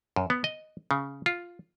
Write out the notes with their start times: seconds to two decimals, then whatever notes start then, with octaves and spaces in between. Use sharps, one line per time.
0.16 F#2
0.30 B3
0.44 D#5
0.91 C#3
1.26 F4